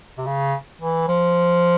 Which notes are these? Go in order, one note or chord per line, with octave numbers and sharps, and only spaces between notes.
C3
C#3
E3
F3